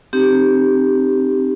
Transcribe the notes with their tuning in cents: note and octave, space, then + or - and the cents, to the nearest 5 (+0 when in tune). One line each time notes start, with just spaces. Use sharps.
C4 +0 D#4 -25 G4 +0